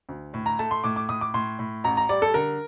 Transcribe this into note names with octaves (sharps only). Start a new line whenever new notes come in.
D2
A2
A#5
A3 A5
C6
A2 D6
D6
A2 D#6
D6
A2 C6
A2
A1 A#5
A#5
G3 D5
A4
D3 A#4